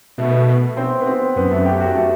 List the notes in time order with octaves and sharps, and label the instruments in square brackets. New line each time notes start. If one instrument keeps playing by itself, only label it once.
[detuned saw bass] B2 [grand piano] A3
[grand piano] B3
A3
C4
B3
C4
[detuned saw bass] F#2 [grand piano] B3
[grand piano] A3
G4
F#4
A3